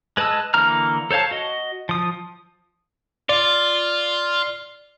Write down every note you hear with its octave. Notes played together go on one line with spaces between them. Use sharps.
G#3 B4 D#5 A5 E6
D3 E3 A#3 A#5 F6
A4 C5 C#5 F5 A5
F#4 D#5
F3 D#6
F4 D5